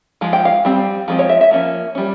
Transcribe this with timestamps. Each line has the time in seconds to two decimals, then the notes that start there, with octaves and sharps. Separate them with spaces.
0.21 F3 G#3
0.33 G5
0.45 F5
0.65 G3 C4
1.08 F3 G#3 C4
1.19 C#5
1.29 E5
1.41 E5
1.51 F3 A#3 C#4
1.95 G3 C#4